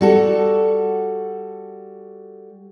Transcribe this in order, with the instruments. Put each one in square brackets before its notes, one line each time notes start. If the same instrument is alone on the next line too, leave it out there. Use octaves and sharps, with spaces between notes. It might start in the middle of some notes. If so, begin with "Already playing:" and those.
[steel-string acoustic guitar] G3 F#4 A4